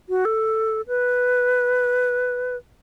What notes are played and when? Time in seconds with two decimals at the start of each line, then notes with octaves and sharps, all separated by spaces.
0.09 F#4
0.25 A4
0.88 B4